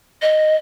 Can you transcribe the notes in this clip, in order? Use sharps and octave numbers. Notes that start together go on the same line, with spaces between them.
D#5